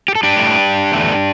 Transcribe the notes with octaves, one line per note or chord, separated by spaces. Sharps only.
G4
A4
D4 G4
A2 A3
E2 D3 A3